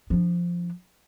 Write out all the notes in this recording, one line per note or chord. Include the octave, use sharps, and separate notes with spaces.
F3 D4